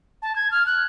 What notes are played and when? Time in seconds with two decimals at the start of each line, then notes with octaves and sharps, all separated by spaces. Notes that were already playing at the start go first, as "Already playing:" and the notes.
0.22 A5
0.36 G#6
0.51 F6
0.66 F#6